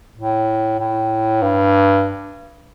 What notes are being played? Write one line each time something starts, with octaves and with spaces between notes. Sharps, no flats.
A2
A2
G2